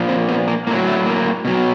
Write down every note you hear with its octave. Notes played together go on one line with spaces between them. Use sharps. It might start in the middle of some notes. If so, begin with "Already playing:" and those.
Already playing: A#2 F3
C4
B3
A#3
A2 F#3 A#3
A3
A#3
B2 F#3